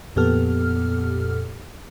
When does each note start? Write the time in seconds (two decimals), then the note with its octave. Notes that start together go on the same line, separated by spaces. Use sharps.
0.16 F2 A#2 B3 G4 A4 F6